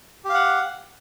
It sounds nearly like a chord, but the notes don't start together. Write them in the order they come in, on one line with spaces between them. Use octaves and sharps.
G4 F5 F#5